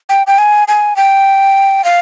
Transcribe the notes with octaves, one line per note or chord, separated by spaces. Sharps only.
G5
G5
G#5
G#5
G5
F5